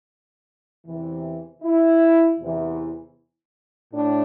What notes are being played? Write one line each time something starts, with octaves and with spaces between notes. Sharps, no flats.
E2 C3 E3
E4
E2 C3 E3
A2 D4